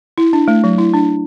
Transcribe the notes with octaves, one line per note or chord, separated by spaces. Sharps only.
E4
D4
A3
F#3
E4
D4